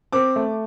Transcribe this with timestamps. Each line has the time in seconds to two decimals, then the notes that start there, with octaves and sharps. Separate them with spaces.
0.12 C4 D6
0.36 A3